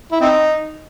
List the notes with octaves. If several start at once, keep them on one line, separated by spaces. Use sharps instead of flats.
E4
C4 D#4